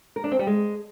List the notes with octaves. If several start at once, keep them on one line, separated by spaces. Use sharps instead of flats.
A#4
D4
C4
G3
G#3